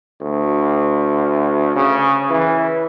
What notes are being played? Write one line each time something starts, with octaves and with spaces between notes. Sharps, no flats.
D2
C#3
E3